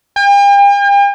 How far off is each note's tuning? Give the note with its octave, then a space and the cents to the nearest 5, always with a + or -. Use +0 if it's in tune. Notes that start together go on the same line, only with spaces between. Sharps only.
G5 +45